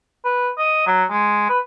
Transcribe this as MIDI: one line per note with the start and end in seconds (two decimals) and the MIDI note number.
0.25 0.50 71
0.59 0.83 75
0.87 1.04 54
1.10 1.46 56
1.50 1.59 71